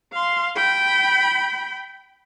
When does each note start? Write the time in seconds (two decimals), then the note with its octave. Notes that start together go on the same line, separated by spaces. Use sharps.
0.13 F5 C6
0.56 G5 B5